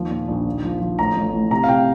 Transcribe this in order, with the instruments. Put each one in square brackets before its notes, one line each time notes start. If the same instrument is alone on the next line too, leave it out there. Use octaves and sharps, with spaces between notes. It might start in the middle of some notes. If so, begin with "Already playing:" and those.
Already playing: [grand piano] D#2 F3
A#2
A#1
D#2
F3
F3
A1 A#5
A1
A2
C3 A#5
F5
C3 G5